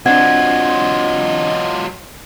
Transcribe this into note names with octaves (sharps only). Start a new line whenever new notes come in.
F#3 C4 D4 F4 D#5 F#5 G#6